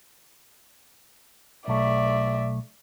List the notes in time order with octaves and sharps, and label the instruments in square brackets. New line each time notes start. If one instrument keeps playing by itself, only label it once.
[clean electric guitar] B1 A3 [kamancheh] D5 E5